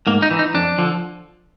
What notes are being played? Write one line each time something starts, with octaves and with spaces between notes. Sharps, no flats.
G#2 A#3
D#4
E3
D#4
F2 D4
D3 F3